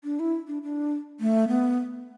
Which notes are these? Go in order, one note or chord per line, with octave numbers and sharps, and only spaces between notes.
D4
E4
D4
D4
A3
B3